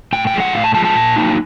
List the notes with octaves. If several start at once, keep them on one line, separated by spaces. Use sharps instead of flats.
A2 G5
G5
F3 G#3
F#5
A2 F5
A5
F3 G#3 A5
A5
A#2
F#3 A#3 D#4